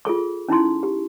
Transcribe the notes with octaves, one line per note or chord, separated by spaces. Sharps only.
F4 G#4 A4 C#6
C#4 D#4 E4 C6
G4